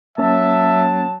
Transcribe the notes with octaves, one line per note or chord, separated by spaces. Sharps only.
F#3 A#3 C#4 E5 A5